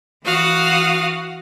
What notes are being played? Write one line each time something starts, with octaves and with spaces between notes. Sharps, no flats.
E3 F#4 F5 D#6